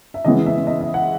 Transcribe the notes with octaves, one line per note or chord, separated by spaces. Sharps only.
E5
C#3 E3 G#3 B3 D#5
E5
D#5
E5
F#5